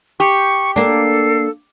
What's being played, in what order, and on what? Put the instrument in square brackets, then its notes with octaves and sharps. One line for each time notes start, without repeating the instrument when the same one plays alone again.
[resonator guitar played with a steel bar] G4 [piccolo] C#6
[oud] A#3 D4 [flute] A4 [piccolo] C7